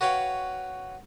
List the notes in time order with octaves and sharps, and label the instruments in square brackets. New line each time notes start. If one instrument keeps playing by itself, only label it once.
[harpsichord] F#4 B4 C#5 F5 G5